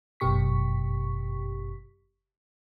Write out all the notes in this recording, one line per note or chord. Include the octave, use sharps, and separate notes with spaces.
G1 F#2 B2 G4 C#6 B6